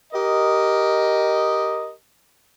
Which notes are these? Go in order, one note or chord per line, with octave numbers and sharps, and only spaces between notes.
G4 A#4 D#5